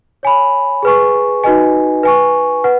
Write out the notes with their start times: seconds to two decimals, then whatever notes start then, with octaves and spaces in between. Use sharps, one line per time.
0.23 C#5 G#5 B5
0.83 G#4 B4 G#5 C#6
1.44 D#4 F#4 B4 D#5 G#5
2.03 B4 G#5 C#6
2.64 B4 F#5